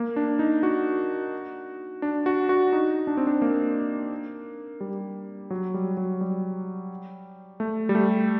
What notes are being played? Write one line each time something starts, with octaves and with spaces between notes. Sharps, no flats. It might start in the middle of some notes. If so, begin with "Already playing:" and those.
Already playing: A#3
D4
D#4
F#4
D4
F#4
F#4
D#4
D4
C4
D4
A#3
G3
F#3
G3
F#3
G3
A3
G3
A3